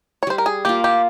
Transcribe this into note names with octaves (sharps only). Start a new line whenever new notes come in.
C#5
G3 C5
A#4
G#4
A#3 F4 G4
G4